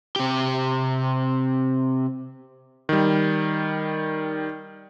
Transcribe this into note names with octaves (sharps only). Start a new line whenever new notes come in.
C3 G4
D#3 G3